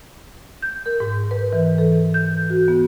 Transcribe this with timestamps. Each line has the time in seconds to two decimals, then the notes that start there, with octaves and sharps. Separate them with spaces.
0.62 G6
0.86 A#4
1.00 G#2
1.31 B4
1.53 E3
1.78 A4
2.14 G6
2.50 F#4
2.68 B3